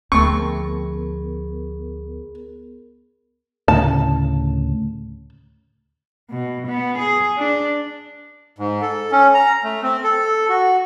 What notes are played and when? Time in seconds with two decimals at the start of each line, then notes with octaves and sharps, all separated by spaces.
0.12 D2 F3 A3 B3 C4 G#4 A#4 C#6
3.68 D2 A2 C#3 A5
6.30 B2
6.68 B3
6.99 G#4
7.38 D4
8.59 G#2
8.82 A4
9.12 C#4
9.34 A#5
9.63 A3
9.83 C4
10.04 A4
10.49 F#4